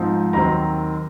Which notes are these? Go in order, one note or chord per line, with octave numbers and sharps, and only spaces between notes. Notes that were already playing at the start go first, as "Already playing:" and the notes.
Already playing: G#2 F3 C4 D#4
D#2 D#3 F#3 C4 A#5